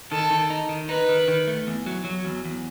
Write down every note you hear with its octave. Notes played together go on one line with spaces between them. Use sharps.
D#3 A4
D#3
D#4
D#3
D#4 B4
D#3
D#3
A3
E2
F#3
F#3
E2
E2